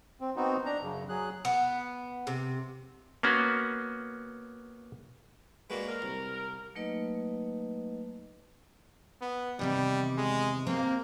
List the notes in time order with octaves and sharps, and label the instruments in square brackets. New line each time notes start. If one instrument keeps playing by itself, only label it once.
[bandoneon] C4
B3 C4 D#4 F#4
D4 A#5
F#2 C#3
F#3 G#4 F#6
[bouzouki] B3
C3
[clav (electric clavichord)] A#3 B3 C#4 F#4
[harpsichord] G#3 A#3 D4 [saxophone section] F#4 B4
[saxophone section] A#4
[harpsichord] C2
[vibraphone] F#3 A3 A#3 D#4 B4 D#5
[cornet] B3
[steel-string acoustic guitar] E2 C3 D#3 [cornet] G3
[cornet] G#3
[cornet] A#3 [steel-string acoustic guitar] C4